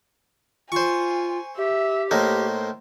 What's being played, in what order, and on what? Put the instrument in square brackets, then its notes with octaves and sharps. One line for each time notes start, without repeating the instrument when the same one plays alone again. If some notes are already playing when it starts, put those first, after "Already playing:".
[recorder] F4 [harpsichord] C5 C#6 [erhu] G#5
[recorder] G4 [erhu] E5
[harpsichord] A2 A#3 D#4 [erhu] C5